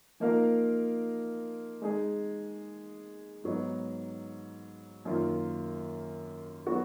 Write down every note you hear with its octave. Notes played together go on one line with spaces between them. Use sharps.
F3 A#3 D#4 A#4 F5
G#3 D#4 G#4
G#2 F#3 B3 D#4
F#2 D#3 A#3 F4
F#3 B3 F#4